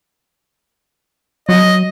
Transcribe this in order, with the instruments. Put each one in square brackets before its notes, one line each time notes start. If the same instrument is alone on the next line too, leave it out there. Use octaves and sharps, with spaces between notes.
[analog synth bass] F#3 [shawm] D#5